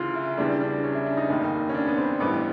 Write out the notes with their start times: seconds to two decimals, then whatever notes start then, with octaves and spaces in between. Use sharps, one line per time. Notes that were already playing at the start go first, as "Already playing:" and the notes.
Already playing: D2 C#3 E3 F4
0.15 E4
0.38 E2 C#3 E3 G3 D4
0.61 D4
0.84 C#4
0.95 E4
1.06 D4
1.17 D#4
1.29 F1 D#2 D#3
1.69 C#4
1.74 D4
1.87 B3
1.98 C4
2.20 A1 G2 E3 B3